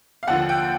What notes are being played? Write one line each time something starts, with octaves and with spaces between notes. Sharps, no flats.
F5
D#2 D3 F3 F#5
G5